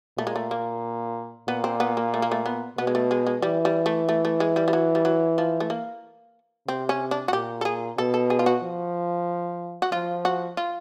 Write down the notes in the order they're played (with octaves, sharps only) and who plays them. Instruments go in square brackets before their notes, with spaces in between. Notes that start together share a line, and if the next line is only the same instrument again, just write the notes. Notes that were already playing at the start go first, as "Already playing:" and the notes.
[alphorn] A#2 [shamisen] A3
[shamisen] G#3
A3
A#3
[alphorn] A#2 [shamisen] B3
[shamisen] C4
B3
A#3
A3
A#3
A3
B3
[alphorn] B2 [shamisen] B3
[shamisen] G#3
A3
G#3
G#3
[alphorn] E3 [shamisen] G3
[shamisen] G3
A3
A3
A3
G#3
G3
G3
F#3
G3
F#3
F3
A3
A#3
[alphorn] C3 [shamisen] C4
[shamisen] C#4
D4
F#4
[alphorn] A#2 [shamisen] G4
[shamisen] A4
G#4
[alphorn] B2 [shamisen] A4
[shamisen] A4
G#4
F4
F#4
[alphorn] F3
[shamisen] F#4
[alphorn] F3 [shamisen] F4
[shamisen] F#4
F4